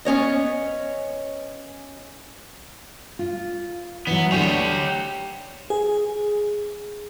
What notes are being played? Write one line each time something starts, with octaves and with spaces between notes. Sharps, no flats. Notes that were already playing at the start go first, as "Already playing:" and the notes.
B3 C#4 C#5 D#5
F4
E3 F#3 B3
D2 D3 G4 C#5 G#5
G#4